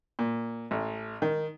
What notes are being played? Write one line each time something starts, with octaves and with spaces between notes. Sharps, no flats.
A#2
A1
D#3